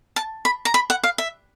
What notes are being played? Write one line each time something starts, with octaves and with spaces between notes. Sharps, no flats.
A5
B5
A#5
B5
F#5
F5
E5